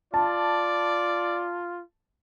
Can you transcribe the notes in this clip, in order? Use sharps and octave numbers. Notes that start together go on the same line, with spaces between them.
F4 D5 A5